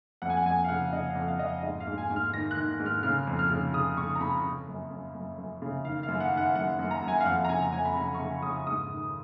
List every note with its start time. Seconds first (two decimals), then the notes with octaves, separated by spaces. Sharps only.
0.22 F2 F#5
0.30 G#5
0.37 F#5
0.45 F2 G#5
0.64 F5
0.68 C#3 F#5
0.93 C#3 D#5
1.10 F5
1.15 F2
1.28 F5
1.39 F2 D#5
1.46 F5
1.63 G#2 D#5
1.80 F5
1.87 G#2
1.98 G#5
2.10 G#2
2.16 F6
2.34 D#3 A#6
2.51 F#6
2.57 D#3
2.80 G#2
2.86 F6
3.03 C#3 F6
3.27 F2
3.39 F6
3.51 C#3
3.74 C#3 D#6
3.97 C#3 C#6
4.15 A#5
4.21 C#3 B5
4.45 C#3
4.68 F#2
4.91 F#2
5.15 F#2
5.38 F#2
5.62 C#3
5.85 D#3 F5
6.03 F5
6.08 F#2
6.20 F#5
6.32 D#3
6.37 F#5
6.56 F#2 F#5
6.79 F#2
6.91 A#5
7.02 F#2
7.08 G#5
7.20 F5
7.26 F2 F#5
7.45 A#5
7.49 C#3 G#5
7.72 F2 G#5
7.85 B5
7.96 C#3 A#5
8.14 C#6
8.19 C#3
8.31 B5
8.42 C#3 D#6
8.49 C#6
8.67 G#2 D#6
8.89 D#3